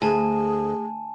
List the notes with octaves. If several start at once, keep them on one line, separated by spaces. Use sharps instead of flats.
D2 G#4 G#5 A5